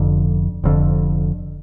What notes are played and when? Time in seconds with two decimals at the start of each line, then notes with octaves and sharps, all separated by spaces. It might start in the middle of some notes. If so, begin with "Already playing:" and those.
Already playing: F1 F2 D3
0.64 F1 F2 D3